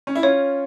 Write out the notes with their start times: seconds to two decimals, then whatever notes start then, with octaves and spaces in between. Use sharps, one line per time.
0.07 C#4
0.15 E4
0.23 C#4 F4 C#5